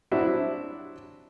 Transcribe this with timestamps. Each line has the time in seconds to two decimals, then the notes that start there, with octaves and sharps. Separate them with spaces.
0.11 F#3 G3 C4 D4 E4 F#4